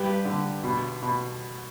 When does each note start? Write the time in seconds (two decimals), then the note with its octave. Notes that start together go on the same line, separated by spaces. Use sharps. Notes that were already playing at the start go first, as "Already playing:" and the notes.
Already playing: G2 G4 B4
0.25 D3
0.64 B2
1.02 B2